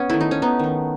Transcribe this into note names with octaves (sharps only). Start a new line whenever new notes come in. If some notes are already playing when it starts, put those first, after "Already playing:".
Already playing: B3 C#4
D#3 A3 E4
D#4
C#4
B3 D#4
D#3 A3